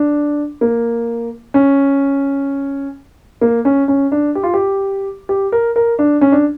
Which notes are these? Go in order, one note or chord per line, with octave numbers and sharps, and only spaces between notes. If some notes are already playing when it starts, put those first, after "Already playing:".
Already playing: D4
A#3
C#4
A#3
C#4
C#4
D4
G4
F4
G4
G4
A#4
A#4
D4
C#4
D4